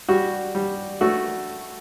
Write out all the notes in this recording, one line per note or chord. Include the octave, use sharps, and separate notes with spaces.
G3 F#4
G3
A3 F#4